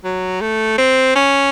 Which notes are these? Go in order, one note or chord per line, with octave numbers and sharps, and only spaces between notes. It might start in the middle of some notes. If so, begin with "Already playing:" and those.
F#3
A3
C4
C#4